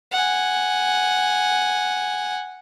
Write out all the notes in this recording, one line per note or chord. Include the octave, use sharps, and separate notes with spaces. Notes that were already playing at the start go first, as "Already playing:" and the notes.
F#5 G#5